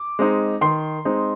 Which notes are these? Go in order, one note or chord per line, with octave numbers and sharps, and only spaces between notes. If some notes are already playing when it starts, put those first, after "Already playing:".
Already playing: D6
G#3 C4 D#4
D#3 C6
G#3 C4 D#4